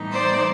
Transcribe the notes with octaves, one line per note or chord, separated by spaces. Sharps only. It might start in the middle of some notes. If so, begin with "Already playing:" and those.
Already playing: A2 E3 G3 B3 D#4
C5 D5